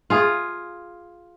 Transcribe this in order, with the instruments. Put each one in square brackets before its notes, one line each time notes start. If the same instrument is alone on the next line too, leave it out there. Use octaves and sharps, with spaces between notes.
[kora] F4 G#4